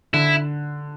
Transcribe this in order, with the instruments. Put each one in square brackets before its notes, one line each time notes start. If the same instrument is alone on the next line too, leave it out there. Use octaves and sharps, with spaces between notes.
[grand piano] D3 [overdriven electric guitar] E4